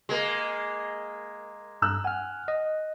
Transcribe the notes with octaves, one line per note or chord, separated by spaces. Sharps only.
G#3 A#3
G2 A#5 E6 F#6
F#5 G#5 F6
D#5